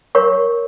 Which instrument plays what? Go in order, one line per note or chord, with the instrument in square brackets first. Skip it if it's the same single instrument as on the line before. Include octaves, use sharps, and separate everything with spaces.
[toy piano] A#4 C#5 C#6